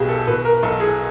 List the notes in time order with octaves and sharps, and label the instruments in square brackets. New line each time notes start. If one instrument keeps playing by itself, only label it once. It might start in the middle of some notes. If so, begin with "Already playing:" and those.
Already playing: [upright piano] B1 B2 G4 G#4
A4
B2 B4
A#4
B1 A4
G#4